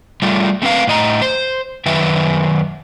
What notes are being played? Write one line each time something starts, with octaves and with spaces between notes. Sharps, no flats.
G3 A3 F4
A3 C4 B4 F5
A2 D#5 A#5
C5
F#2 D#3 B4 E5